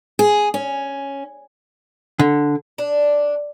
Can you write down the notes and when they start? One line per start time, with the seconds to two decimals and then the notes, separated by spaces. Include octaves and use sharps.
0.19 G#4
0.54 C#4
2.19 D3
2.78 D4